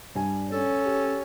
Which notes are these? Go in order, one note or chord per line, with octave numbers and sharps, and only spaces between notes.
G2 G3 G#5
C#4 A4
G4